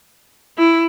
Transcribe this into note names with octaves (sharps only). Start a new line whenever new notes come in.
E4